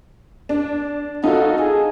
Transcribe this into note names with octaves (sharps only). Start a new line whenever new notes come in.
D4
D#4 F4 F#4 A4
G#4